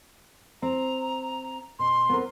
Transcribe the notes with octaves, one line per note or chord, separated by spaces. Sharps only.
C4 A#5
B2 C6
B3 C4 A#4